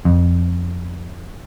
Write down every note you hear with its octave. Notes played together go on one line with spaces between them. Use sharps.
F2